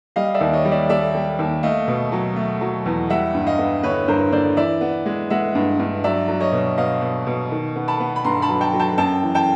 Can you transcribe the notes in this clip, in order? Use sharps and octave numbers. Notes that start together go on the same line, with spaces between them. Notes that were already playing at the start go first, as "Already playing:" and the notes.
G3 D#5 F5
D5 E5
D#2
C#5 D#5
G3
D5 E5
G3 D5 E5
G3
D#2
A3 D#5 F5
B2
F#3
A3
F#3
E2
G3 E5 F#5
G2
D#5 F5
B3
D3 B4 C#5
G2 A#4 C5
D3 C5 D5
E3 D5 E5
B3
G#3
G#3 E5 F#5
G2
G2
F#3 D5 E5
F#3
C#5 D#5
B2
B2 D#5 F5
B2
B2
D#3
B3
A5 B5
B3
B5
G2 A#5 C6
A5 B5
F#3
G5 A5
F#3
G5 A5
F#2 G5 A5
E3
G5 A5